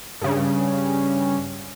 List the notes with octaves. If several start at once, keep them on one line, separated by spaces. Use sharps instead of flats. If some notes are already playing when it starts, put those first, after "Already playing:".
G2 C#3